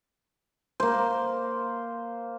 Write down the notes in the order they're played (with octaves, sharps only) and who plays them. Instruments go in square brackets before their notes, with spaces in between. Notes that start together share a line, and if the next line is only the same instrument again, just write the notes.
[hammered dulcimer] A#3 C5